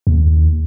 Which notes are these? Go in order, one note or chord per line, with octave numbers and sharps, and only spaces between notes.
D#2